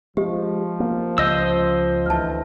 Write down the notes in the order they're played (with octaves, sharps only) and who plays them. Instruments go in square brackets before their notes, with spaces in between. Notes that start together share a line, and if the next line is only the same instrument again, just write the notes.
[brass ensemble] F3 [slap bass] G#3 [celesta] G4
[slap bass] A#3
[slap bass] C#2 [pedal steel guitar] C5 D#5 E6
[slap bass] D2 E3 [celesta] A5 F6